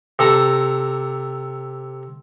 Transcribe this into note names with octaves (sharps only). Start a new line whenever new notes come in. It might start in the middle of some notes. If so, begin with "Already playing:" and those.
C3 A4 A#5